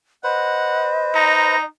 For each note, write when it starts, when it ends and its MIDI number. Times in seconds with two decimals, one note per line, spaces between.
0.24 1.57 71
0.24 1.57 72
0.24 1.64 75
0.24 0.91 78
1.15 1.66 63
1.15 1.63 82